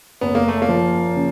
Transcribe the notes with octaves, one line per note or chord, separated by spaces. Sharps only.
F#1 B3
A#3
A3
A#3
F3
C#3